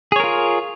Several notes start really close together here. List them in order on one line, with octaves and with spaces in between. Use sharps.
G#4 C#5 A#4 F4